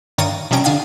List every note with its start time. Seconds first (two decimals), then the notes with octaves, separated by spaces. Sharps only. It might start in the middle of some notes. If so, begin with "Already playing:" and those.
0.18 G2 D#3 A#3 C#5 D#6 A6
0.51 C3 F3 G3 C#4 A#5 D7
0.64 D3 D4 F5 D#6 G#6